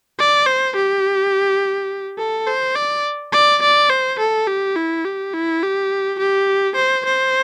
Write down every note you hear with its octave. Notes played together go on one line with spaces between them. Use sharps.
D5
C5
G4
A4
C5
D5
D5
D5
C5
A4
G4
E4
G4
E4
G4
G4
C5
C5